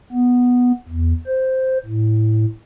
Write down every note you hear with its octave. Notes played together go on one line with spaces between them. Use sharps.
B3
E2
C5
A2